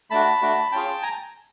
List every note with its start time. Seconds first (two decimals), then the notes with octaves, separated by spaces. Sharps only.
0.10 A3 D4 F#4 A5 B5
0.42 A3 D4 F#4
0.72 C#4 F4 G#4 G5 A5
1.02 G#5 A#5